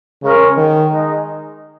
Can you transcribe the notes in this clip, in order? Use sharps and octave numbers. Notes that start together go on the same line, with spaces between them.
C#3 G#3 C#4 A#4
D#3
G#3 D#4 G#4 D#5